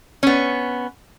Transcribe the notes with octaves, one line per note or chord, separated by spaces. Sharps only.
B3 C#4